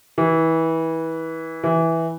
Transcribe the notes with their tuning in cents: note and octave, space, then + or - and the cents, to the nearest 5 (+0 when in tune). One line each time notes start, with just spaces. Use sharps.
E3 -25
E3 -5